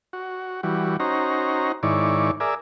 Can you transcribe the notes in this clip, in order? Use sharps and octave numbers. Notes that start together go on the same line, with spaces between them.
F#4
E3 G3 F#4
C#4 D#4 F#4 C5 A#5
G#2 D#3 E4 C#5 D5
G#4 A#4 D5 E5